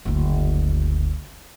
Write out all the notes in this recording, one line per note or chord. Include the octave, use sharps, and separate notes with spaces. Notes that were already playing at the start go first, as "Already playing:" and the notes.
F#1 D2